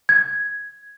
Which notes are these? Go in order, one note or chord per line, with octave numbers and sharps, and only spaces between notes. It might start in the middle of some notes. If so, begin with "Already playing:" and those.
G#6